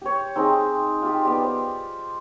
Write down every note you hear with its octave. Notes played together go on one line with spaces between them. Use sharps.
G4 C#5
C4 D#4 G#4 C5
F4 G4
B3 G4 D5
C5